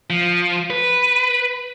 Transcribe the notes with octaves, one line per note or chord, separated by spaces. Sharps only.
F3
B4